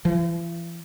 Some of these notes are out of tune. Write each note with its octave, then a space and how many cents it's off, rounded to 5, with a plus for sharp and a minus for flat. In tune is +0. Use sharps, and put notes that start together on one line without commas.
E3 +45